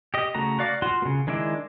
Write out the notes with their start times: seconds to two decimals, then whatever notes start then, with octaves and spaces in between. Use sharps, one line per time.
0.14 G4 D#5
0.35 C#3 A3 F#4 A#5
0.59 F#4 D5 F5 D6
0.82 F4 F#4 C6
1.02 C#3 A#3
1.27 D#3 G#3 D4 E4 D6